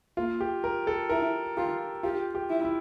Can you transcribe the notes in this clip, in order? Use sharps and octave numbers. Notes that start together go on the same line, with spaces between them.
A#3 F4
G4
A#4
A4
E4 A#4
F4 G4
F4 G4
G4
E4
E4